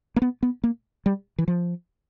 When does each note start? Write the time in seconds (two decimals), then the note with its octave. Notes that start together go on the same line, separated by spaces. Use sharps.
0.16 A#3
0.22 B3
0.43 B3
0.64 A#3
1.06 G3
1.38 E3
1.48 F3